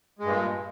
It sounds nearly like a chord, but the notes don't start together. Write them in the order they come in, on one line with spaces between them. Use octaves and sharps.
G#3 G2 A#2